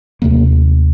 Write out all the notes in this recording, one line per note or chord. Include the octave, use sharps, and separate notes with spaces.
D#2 C3 A3 A#3